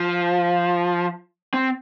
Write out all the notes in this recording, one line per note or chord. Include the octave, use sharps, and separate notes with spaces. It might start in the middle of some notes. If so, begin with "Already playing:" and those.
Already playing: F3
C4